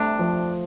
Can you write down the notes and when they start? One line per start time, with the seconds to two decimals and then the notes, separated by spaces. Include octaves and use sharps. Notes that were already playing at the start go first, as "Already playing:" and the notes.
Already playing: C3 G3 A3 D4
0.19 F3